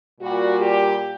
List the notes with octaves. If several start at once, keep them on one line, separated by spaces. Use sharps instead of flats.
A#2 G3 F#4
G4